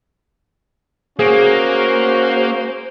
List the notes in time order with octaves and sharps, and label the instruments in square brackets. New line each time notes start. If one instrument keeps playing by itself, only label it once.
[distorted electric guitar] A#3 [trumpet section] C#4 F#4 [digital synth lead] G#4 [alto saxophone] C5